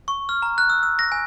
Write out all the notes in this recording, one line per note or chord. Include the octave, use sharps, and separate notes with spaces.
C#6
F6
A#5
F#6
E6
E6
A#6
G#5